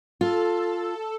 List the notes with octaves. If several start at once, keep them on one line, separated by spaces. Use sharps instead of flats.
F4 A4